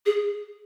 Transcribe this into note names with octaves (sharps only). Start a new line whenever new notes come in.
G#4